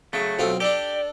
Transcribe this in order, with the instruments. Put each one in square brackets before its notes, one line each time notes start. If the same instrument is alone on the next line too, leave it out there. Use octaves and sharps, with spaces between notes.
[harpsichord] C#3 [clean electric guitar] F#3 A3
[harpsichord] B1 C4 F4 [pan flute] A4
[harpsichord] D4 A4 [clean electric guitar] G4 [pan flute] D5